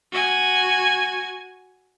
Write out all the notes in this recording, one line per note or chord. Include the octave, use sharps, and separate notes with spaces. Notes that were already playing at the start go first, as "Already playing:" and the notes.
F#4 G#5